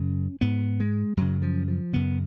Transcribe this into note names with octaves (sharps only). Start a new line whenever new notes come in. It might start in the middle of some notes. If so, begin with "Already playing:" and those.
Already playing: F#2 C#3 C#4
G#2 B3
G#3
F#2 C#3 F#3
F3
F3
F#2 C#3 B3